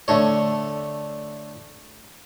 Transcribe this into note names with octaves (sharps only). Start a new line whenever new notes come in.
D3 A3 C#5